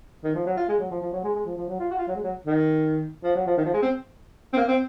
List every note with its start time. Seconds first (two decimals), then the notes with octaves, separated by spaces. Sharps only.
0.24 D#3
0.35 F3
0.46 F#3
0.57 F4
0.69 G#3
0.79 F#3
0.91 F3
1.02 F3
1.13 F#3
1.24 G#3
1.35 G#3
1.46 F3
1.57 F3
1.69 F#3
1.79 F4
1.91 F#4
1.99 F4
2.08 F#3
2.16 G#3
2.24 F#3
2.46 D#3
3.24 F3
3.35 F#3
3.47 F3
3.57 D#3
3.65 F3
3.73 G#3
3.82 C4
4.53 C4
4.57 A#3
4.68 C4